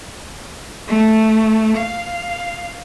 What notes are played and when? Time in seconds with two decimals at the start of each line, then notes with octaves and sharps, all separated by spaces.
0.88 A3
1.77 F5